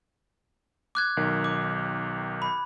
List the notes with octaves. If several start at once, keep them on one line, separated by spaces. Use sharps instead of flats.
D6 F#6 G#6
B1 D#3
D6
B5